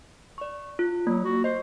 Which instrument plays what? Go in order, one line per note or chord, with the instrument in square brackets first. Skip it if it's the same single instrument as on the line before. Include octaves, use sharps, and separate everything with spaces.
[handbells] D5 C#6
F4
[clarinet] F#3 [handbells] A#3
[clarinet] F#4
[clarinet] C5 [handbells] D#5